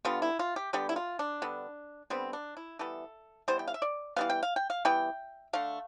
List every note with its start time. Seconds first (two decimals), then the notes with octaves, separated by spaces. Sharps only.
0.05 D3 G3 B3 F4
0.22 E4
0.39 F4
0.56 G4
0.73 D3 G3 B3 G4
0.89 E4
0.96 F4
1.19 D4
1.42 D3 G3 B3
2.10 D3 G3 B3 C4
2.33 D4
2.57 E4
2.79 E3 G3 B3 A4
3.48 E3 G3 B3 C5
3.59 G5
3.68 F5
3.74 E5
3.82 D5
4.16 E3 G3 B3 F5
4.29 G5
4.43 F5
4.56 G5
4.70 F5
4.85 E3 G3 B3 G5
5.53 D3 A3 F5